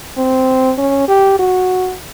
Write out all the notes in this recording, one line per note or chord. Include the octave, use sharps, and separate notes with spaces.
C4
C#4
G4
F#4